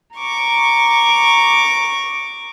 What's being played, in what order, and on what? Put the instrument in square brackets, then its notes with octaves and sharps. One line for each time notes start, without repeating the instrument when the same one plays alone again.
[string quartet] A#5 C#6 D6